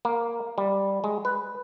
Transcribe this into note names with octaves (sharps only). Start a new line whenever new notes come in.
A#3
G3
G#3
B4